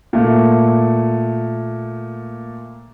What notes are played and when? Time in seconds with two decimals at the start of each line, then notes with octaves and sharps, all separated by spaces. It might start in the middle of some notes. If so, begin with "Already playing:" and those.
0.13 A#2 A3